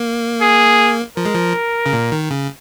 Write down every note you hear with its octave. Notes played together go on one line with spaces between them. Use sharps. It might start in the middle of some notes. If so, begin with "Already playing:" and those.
Already playing: A#3
G#4
F3 A#4
G#3
F3
C#3
A#2
D#3
C#3